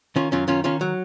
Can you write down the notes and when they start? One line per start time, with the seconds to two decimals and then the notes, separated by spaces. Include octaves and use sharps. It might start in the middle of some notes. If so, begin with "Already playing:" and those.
0.16 D#3 C#4 F4
0.32 F#2 C#4 F4
0.48 D#3 C#4 F4
0.64 D#3 C#4 F4
0.81 F#3